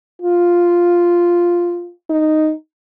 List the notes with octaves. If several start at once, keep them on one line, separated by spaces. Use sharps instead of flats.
F4
D#4